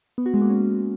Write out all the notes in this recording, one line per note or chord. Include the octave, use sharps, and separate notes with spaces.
B3
F#4
G#3
A#3
C#4